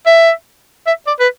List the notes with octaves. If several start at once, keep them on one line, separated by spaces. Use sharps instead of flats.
E5
E5
D5
B4